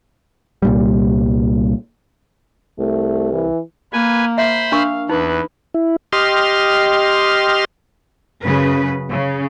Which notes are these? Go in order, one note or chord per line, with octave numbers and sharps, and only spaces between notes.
C2 A#2 G3
C2 A3
E3
A#3 B4 G#5
C5 E5 B5 C6
D4 A#4 F5 C#6
E2 D#4 B4
E4
G4 D#5 C6 F6
F#2 C#3 B4
C#3